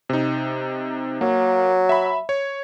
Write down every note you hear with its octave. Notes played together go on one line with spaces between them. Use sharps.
C3 D#4
F#3 A#3
E5 B5
C#5